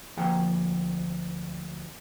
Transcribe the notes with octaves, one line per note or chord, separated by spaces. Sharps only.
D2 F3 A#3 G#4 F#5 G5